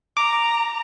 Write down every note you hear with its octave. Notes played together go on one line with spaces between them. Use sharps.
A#5 D6